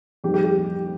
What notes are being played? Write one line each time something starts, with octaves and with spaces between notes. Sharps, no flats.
F2 D#3 G3 G4
G4
G4